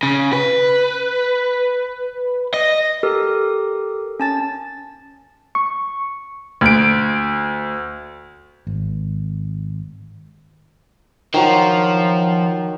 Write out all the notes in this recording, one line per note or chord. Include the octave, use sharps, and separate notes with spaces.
C#3
B4
D#5
G4 A4 A#4
C#4 A5 A6
C#6
D2 D7
G#1
D#3 F3 F#3